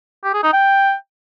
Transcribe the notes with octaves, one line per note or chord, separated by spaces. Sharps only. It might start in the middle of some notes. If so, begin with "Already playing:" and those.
G4
G#4
D#4
G5